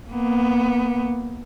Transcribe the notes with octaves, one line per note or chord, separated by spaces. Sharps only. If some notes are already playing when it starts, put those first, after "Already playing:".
A#3 B3